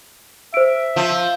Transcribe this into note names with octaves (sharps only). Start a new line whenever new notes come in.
C5 E5 D7
F3